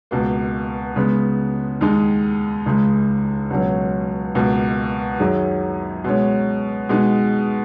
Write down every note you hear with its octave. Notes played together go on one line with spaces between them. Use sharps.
C#2 B2 A#3
C#3 G#3 B3
D#2 D#3 G#3 D#4
C#2 C#3 G#3
C#2 B2 F#3 C#4
C#2 B2 A#3
F#2 D#3 F#3 C#4 G#4
B2 G#3 C#4
B2 G#3 D#4 G#4